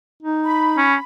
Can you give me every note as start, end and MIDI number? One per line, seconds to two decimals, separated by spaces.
0.23 0.84 63
0.45 1.03 83
0.77 0.95 61